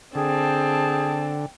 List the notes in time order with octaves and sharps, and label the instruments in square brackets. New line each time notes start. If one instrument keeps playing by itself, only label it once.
[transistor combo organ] D3 [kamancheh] C4 A5 [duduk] G#4 [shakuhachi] G5